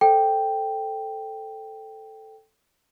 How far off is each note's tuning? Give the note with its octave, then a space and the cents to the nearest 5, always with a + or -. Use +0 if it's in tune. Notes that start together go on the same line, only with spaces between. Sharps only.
A4 +0 C5 +0 G5 +0